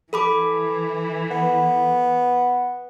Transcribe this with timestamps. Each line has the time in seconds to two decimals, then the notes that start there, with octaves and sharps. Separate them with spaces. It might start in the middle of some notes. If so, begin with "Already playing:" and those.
0.13 E3 A4 B5 D6
1.31 B3